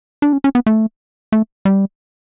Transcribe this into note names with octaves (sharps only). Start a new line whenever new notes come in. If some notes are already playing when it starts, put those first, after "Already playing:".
D4
C#4
C#4
B3
A3
A3
G3